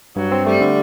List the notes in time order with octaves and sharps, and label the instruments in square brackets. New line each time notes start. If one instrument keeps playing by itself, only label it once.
[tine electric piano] G2 [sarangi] F#3
[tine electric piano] C4
[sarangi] G3 [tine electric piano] A3
[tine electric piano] D3